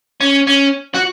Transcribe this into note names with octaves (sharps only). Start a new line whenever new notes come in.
C#4
C#4
F#4